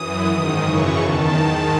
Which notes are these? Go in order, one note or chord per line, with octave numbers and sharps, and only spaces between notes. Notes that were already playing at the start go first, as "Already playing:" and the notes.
Already playing: F#2 E3 D#6
G#2 D#3
F#2 C#3 E3 C#6
E2 D#3 A5
G#2 D#3